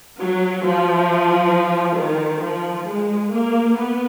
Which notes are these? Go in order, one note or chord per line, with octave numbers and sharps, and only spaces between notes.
F#3
F3
D#3
F3
G#3
A#3
B3